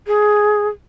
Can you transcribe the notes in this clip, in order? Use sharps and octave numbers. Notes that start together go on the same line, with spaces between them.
G#4